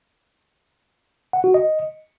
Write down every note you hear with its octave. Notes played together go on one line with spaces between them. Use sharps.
F#5
F#4
D#5